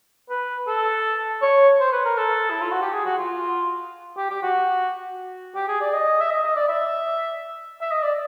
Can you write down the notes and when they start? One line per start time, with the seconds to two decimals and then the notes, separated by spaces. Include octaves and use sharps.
0.30 B4
0.67 A4
1.42 C#5
1.80 C5
1.92 B4
2.05 A#4
2.17 A4
2.50 E4
2.61 F4
2.71 F#4
2.82 G4
2.93 G#4
3.05 F#4
3.18 F4
4.17 G4
4.30 G4
4.43 F#4
5.55 G4
5.68 G#4
5.81 D5
5.93 D#5
6.21 E5
6.31 D#5
6.43 D#5
6.56 D5
6.68 E5
7.81 E5
7.92 D#5
8.03 D5